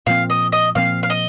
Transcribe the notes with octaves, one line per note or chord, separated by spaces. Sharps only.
A#2 F3 C4 F5
D#5
D#5
A#2 F3 C4 F5
F5
D#5